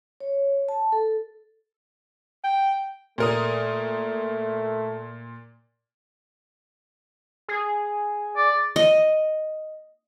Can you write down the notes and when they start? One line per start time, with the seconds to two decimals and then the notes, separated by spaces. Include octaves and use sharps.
0.20 C#5
0.69 A5
0.92 A4
2.44 G5
3.18 A#2 A3 A#4 D#6
7.49 G#4
8.37 D5
8.76 D#5